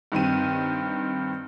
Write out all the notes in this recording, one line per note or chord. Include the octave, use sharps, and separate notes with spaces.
G2 D#3 C4 D#7